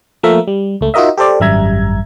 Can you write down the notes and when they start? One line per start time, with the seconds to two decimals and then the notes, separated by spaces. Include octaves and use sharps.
0.23 F3 A3 A#3 A#4 E5
0.47 G3
0.81 C#2 A3
0.94 D#4 F4 F#4 A#4 D#5 E5
1.17 G4 A4 C5 D5
1.40 G#1 F#2 G3 E5 A#5 G#6